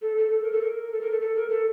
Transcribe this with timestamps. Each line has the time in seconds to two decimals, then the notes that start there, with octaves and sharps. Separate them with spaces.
0.02 A4
0.17 A4
0.31 A4
0.42 A#4
0.52 A4
0.62 A#4
0.92 A4
1.01 A#4
1.11 A4
1.21 A4
1.36 A#4
1.50 A4